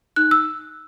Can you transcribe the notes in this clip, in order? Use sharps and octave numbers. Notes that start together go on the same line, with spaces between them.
D#4 F#6
E6